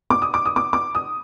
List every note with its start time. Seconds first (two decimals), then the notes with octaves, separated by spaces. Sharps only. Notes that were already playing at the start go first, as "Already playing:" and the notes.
0.10 D6
0.22 D#6
0.34 D6
0.45 D#6
0.56 D6
0.73 D6
0.95 D#6